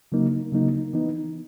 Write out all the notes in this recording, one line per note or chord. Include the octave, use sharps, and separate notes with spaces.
C#3 F#3 A#3 D#4
C#3 F#3 A#3 D#4
E3 B3 D#4